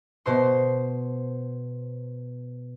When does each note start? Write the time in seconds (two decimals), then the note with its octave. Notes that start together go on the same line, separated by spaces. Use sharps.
0.26 B2 C5 C6